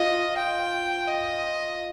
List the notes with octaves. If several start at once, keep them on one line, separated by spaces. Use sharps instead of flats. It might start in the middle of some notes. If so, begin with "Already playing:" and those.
Already playing: F4 D#5
G5
D#5